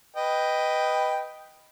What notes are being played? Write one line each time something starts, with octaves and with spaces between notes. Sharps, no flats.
B4 D#5 G5